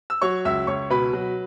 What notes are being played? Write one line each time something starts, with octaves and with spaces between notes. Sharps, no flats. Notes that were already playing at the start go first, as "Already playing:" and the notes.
E6
F#3 C#5 C#6
C#2 E5 E6
C#2 C#5 C#6
B2 B4 B5
F#3